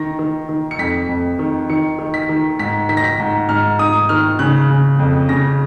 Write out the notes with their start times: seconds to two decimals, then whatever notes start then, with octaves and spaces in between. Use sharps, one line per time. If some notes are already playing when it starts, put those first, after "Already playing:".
Already playing: D#3 A#6
0.19 D#3
0.49 D#3
0.71 C#7
0.79 F2 B6
1.09 F2
1.39 D#3
1.70 D#3 C#7
1.99 D#3
2.14 B6
2.29 D#3
2.59 G#2 B6
2.89 D#3 B6
2.97 A#6
3.04 B6
3.20 G#2
3.49 G#2 F6
3.79 G#2 D#6
4.09 D#3 F6
4.39 C#3 F#6
4.70 C#3
4.99 F2
5.29 C#3 A#6